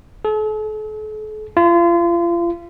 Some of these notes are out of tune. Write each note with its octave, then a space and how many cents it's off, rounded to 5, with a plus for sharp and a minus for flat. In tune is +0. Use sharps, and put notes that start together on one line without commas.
A4 -45
F4 -35